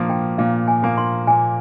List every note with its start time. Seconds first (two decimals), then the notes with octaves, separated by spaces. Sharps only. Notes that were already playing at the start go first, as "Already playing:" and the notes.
Already playing: A#2 F3 A#3
0.10 G5
0.38 A#2 F5
0.68 G#5
0.83 F3 A#3
0.98 C6
1.27 A#2 G#5